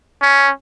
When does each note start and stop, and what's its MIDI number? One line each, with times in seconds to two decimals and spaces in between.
0.22 0.51 61